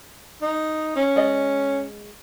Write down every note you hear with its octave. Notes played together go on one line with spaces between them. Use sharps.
D#4
C#4
G#3 D5 D#5